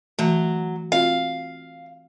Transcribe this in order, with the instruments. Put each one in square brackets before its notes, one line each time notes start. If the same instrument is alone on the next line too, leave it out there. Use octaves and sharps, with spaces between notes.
[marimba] E3 A3 [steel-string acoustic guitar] F#3
[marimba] C4 F4 F#4 [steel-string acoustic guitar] F5